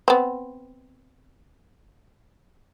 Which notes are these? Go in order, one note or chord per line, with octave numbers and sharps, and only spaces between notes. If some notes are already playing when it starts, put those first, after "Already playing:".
B3 C4